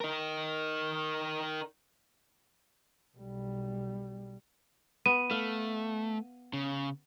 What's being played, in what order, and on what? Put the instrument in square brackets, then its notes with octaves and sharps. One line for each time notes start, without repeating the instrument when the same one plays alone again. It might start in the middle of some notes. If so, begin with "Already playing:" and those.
[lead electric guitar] D#4 A#4
[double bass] B1 G3
[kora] B3 [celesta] D#7
[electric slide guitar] A3 [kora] F5
[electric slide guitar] C#3